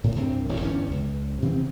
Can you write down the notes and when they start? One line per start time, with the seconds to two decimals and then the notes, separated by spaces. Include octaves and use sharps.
0.04 A2
0.16 C2 G2 C3 C4
0.49 D#1 B1 F2 A#2
0.60 G1 E2 G2 C#4
0.91 C#2
1.42 C3 E3 B3 C4